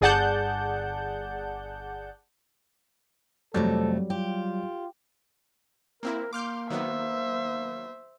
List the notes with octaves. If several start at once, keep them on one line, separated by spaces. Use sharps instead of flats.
G1 G#4 D5 F#5 A5 G6
F2 C3 F#3 G3 A3 A4
F4 G4
A#3 C4 E4 A#4
A#3 C6 D6 F6 G6
D#3 F#3 B3 C5 E5